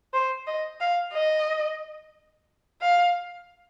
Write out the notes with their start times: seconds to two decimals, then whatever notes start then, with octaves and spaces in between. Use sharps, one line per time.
0.13 C5
0.47 D#5
0.80 F5
1.13 D#5
2.81 F5